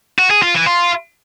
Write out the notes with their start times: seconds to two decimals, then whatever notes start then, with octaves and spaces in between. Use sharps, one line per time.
0.19 F#4
0.31 G#4
0.42 F4
0.54 E3
0.66 F4